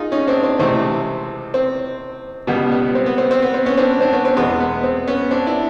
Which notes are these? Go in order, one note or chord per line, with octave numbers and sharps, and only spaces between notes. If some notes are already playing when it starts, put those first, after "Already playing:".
Already playing: D#4 F4 G#4
C#4 D#4
C4 D4
C4
C#2 C3 E3 A3 C4
C4
C#2 B2 G3 B3
B3
C4
B3
C4
C4
B3
C4
B3 C#4
C4 D4
C4 D4
B3 C#4
C4
E2 B2 G#3 B3
B3
C4
B3 C#4
C4 D4
D4 E4